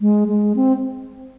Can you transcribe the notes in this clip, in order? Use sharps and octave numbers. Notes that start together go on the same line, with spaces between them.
G#3
G#3
C4